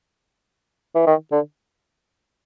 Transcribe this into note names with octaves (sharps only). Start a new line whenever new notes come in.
E3
D#3
D3